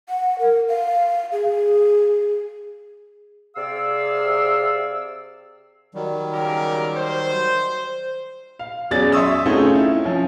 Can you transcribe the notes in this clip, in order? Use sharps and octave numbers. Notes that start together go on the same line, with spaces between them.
F#5
A#4
F5
G#4
C3 G#4 D5 F5 E6
D#3 F#3 G3
C#3 G4 A#4
C5
F5
E2 F#3 C#4 G#4 D5 A6
E5 C6 C#6 D#6 E6
A3 C4 C#4 D#4 F4 G#4
E4
F3 C#4